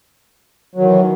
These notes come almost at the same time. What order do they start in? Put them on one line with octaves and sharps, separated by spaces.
F#3 D#3 E3